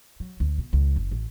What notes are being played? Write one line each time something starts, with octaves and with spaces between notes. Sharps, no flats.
F#3
D2
B2
C#2
F#1
A1